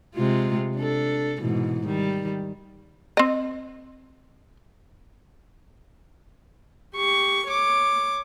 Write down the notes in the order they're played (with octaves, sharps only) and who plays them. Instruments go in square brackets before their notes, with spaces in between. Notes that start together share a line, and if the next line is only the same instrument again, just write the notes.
[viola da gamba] C3 G#3 F4
D4 A4
G#2 B2 E3
D#3 G3
[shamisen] C4 D#5
[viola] G4 C#6
C#5 D6